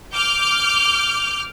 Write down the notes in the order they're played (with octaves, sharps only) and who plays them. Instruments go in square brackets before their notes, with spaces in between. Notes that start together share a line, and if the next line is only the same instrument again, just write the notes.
[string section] D6 F6 G6